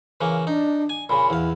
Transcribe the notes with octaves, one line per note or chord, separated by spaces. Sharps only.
C#3 E3 A#3
D4 D#4
G#5
A#2 C#3 B5
E2 E4 F5